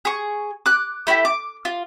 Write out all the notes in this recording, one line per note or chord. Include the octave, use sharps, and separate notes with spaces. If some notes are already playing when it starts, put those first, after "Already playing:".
G#4 C#6
D6 F#6
A3 E4 F#4 G4
D6
F4